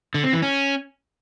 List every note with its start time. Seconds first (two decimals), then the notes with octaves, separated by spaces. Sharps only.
0.14 D3
0.24 C4
0.33 E3
0.42 C#4